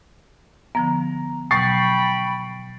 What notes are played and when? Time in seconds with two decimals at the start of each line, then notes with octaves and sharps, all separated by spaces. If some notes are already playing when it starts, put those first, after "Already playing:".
0.75 D3 F3 B3 A#5
1.51 B2 F#3 G5 B5 C#6 A6 C7